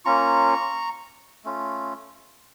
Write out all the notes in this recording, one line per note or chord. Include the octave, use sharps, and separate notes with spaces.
A#3 C#4 F4 A#5 C#6
A3 C#4 F4